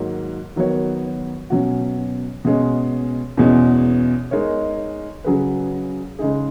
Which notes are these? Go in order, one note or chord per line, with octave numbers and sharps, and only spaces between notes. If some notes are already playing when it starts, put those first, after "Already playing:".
Already playing: G#2 D#3 F#3 A#3
D#3 F#3 B3 F#4 C#5
B2 F#3 C#4 F#4
B2 G#3 C#4
E2 B2 G#3 C#4
G#3 D#4 A#4 C#5
C#3 F#3 C#4 G#4 B4
C#3 G#3 D#4 G#4